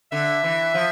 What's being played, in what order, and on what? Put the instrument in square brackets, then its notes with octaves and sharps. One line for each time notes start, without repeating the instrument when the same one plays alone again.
[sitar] D3 [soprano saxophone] E5
[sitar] E3
F3